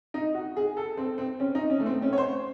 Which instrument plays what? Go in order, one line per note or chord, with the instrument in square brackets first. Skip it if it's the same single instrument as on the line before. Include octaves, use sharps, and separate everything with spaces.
[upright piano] D#4
F#4
G#4
A4
C4
C4
C#4
D#4
C#4
A3
C4
C#4
C#5
C5